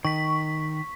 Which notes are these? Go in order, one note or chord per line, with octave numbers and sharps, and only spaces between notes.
D#3 C#6 B6